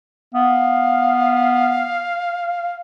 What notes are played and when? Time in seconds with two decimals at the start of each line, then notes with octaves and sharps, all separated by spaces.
0.34 B3 F5